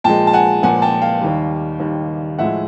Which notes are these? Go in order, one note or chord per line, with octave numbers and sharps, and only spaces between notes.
A#2 F3 G#3 G5 A5
A5
F#5 G#5
A#2 F3 G#3 F#5 G#5
G5 A5
F5 G5
D#2 D#3 G3
D#2 D#3 G3
A2 F3 G#3 E5 F#5